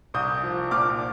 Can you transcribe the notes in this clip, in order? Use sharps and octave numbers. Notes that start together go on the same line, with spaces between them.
C2 D#6 G6
F3
A#2 D6 F6